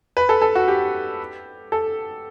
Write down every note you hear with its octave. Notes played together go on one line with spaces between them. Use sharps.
B4
A4
A4
F#4
G4
A4